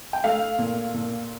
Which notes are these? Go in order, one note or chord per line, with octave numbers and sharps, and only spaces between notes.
G5
A3 F5
A#2
A#2